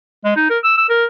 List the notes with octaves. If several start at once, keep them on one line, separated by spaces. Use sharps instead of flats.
G#3
D#4
A#4
E6
E6
A#4